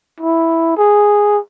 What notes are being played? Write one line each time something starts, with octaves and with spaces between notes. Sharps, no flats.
E4
G#4